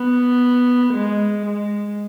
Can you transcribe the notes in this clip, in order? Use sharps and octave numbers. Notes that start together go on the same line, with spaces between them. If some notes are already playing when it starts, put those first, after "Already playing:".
Already playing: B3
G#3
G#3